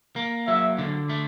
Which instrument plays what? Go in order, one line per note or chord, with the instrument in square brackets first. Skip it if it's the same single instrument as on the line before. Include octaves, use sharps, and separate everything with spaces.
[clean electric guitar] A#3
[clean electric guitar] F#3 [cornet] E5
[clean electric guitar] D3
A3